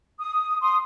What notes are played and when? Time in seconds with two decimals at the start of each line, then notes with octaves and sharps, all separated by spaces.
0.19 D#6
0.61 C6 D#6